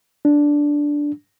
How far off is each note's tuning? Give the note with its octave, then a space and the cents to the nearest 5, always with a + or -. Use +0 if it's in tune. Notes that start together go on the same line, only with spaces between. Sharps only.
D4 -5